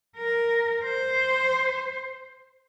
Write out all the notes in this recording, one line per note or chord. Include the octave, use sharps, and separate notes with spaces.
A#4
C5